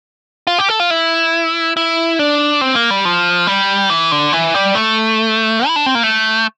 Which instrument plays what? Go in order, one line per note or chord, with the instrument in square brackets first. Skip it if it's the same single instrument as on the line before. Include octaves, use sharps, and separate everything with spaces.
[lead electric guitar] F4
G4
A4
F4
E4
E4
D4
C4
A#3
G3
F3
G3
E3
D3
E3
G3
A3
E4
D4
C4
A#3
A3